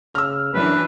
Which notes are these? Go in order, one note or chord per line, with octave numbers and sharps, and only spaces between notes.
C#3 E6 F6
F#2 E3 D4 B4